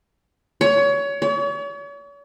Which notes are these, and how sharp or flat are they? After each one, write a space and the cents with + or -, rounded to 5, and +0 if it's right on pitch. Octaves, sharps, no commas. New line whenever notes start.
C#5 +25
C#5 +40